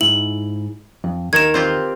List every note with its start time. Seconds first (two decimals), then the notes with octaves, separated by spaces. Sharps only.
0.01 G#2 E4 F#7
1.04 F2
1.33 D#2 D#3 A#4 G#6 E7
1.54 C4 F4 G4